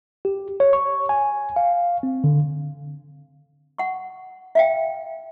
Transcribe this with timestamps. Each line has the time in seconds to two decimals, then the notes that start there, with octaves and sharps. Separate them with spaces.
0.25 G4
0.60 C#5
0.73 C#6
1.09 G#5
1.56 F5
2.03 C4
2.24 D3
3.78 F#5 C#6
4.55 E5 F5 G5